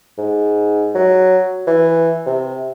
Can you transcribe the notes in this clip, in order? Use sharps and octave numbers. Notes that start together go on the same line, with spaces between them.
G#2
F#3
E3
C3